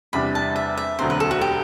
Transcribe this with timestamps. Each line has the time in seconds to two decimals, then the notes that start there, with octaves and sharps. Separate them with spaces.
0.13 E2 C3 G3 D4 B5
0.35 A5
0.56 E5
0.77 E5
0.99 E1 D2 D3 F#3 C4 C5
1.10 B4
1.20 A4
1.31 F#4
1.41 G4